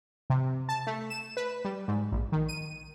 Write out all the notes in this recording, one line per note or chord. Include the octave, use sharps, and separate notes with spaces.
C3
A5
A3
E7
B4
G3
G#2
A#1
D#3
D#7